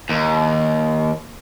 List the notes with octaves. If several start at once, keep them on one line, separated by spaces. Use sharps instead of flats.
D#2